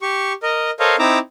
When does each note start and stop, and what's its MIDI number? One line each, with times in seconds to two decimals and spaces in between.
0.02 0.33 67
0.02 0.33 85
0.43 0.71 70
0.43 0.71 75
0.80 0.96 69
0.80 0.96 70
0.80 0.96 72
0.80 0.96 73
0.80 0.96 75
0.80 0.96 77
0.99 1.18 60
0.99 1.18 63
0.99 1.18 64
0.99 1.18 82
0.99 1.18 86
0.99 1.18 88